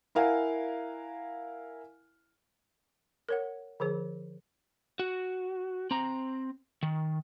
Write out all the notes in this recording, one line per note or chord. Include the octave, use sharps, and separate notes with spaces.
E4 A#4 F5 F#5 G#5
A#4 C#5 F#5
D3 F3 G#4 C5
F#4
C4 A#5
D#3